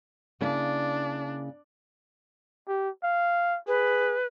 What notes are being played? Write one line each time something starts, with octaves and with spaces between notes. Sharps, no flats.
C#3 A#3 D4 E4
G4
F5
G#4 B4